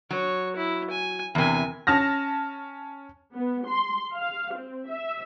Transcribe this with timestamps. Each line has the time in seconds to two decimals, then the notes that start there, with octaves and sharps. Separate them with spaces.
0.11 F#3 C#5
0.56 E4
0.91 G#5
1.35 E2 C3 A#4 G#5
1.87 C#4 A5 F6 A#6
3.35 B3
3.67 C6
4.16 F5
4.54 C4
4.89 E5